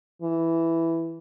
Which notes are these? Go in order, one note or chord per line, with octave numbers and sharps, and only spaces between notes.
E3